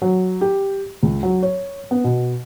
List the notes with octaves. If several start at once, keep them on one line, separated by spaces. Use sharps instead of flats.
F#3
G4
C#2
F#3
C#5
B3
B2